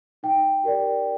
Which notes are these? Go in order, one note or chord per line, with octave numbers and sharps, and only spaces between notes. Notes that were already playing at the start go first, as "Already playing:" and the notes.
D#4 G5
G4 A#4 D5